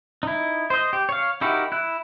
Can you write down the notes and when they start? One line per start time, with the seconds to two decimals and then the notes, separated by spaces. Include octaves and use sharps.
0.23 D#4 E4
0.70 C5 D#5
0.93 G4
1.09 C#5 F5
1.41 D#4 E4 F#4 G4 A#4
1.72 E4 F#6